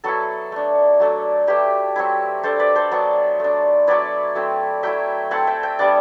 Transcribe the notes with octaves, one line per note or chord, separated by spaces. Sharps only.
F#3 B3 E4 F#4 A4
A3 D4
F#3 A3 D4
A3 E4 G4 B4
F#3 C4 E4
A3 D4 A4 C5
B4 D5
A4 C5
F#3 B3 D4
A3 D4
F#3 B3 E4 B4 D5
F#3 A3 C4 E4
F#3 A3 E4 E5 G5
A3 C4 E4 F#5 A5
E5 G5
E5 G5
G3 B3 D4 D5 F#5